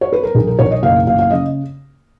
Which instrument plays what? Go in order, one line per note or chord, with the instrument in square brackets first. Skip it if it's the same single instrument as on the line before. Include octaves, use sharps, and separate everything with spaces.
[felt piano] C#5
B4
A#4
B1 G#4
A#4
B1 C#5
D#5
F#1 F5
F#1 F5
F5
C#3 D#5